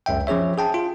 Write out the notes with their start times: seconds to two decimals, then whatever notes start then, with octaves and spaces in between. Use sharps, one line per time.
0.06 C#2 F#2 E5 G5
0.27 F3 C#4 G#4 C#5 E5
0.58 G#4 G5 A5
0.74 F4